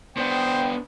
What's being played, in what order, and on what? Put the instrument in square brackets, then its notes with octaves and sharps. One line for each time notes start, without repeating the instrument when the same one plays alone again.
[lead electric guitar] B3 D4 [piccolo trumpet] C5 [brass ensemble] G5